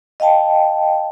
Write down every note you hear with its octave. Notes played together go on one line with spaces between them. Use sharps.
D#5 F5 G5 A5